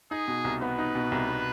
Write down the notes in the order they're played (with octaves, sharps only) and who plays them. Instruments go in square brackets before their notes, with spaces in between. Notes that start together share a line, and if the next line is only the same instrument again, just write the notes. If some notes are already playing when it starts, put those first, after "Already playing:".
[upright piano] D#4 [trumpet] G#4
[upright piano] B2
C2
[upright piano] B3 [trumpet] B4
[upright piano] D#4
B2
C2
B3